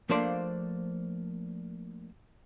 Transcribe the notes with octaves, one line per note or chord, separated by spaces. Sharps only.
F3 A3 A#3 D4 C5 D5